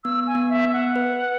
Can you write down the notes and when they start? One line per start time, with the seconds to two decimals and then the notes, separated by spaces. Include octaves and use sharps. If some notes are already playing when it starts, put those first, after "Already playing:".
0.04 B3 E6
0.27 G#5
0.35 B3
0.49 E5
0.65 B3
0.73 F#5
0.96 B4